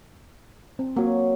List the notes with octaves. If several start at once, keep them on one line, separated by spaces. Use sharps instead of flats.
C4
F#3 A#3 F#4